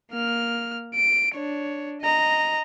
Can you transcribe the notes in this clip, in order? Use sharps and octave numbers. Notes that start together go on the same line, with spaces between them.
A#3 F6
D7
D4 C#5
D#5 A#5